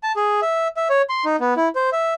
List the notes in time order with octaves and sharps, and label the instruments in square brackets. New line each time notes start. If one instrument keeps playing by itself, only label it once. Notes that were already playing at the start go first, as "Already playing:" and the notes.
[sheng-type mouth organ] A5
G#4
E5
E5
C#5
C6
D#4
B3
E4
C5
E5